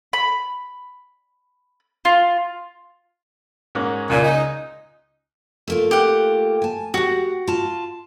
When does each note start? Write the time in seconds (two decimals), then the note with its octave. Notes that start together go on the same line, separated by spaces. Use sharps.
0.13 B5
2.05 F4
3.75 G#2 A#3 C#4
4.09 C#2 A#2 G#5
4.23 D#4
5.68 A3 A#3 F4
5.91 G4 F#5
6.62 G#5 A5
6.94 F#4 G4 F#5
7.48 F4 A5